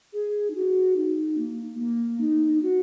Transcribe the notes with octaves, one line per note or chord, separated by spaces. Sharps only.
G#4
D#4
F#4
D#4
A#3
A#3
D#4
D#4
F#4